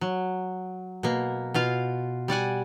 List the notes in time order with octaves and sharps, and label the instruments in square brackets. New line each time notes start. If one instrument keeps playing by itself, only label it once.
[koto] F#3
B2 A#3
B2 F4 F5
G3 D5 F#5 G#5